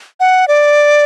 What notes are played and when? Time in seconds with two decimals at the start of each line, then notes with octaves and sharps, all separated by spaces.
0.20 F#5
0.48 D5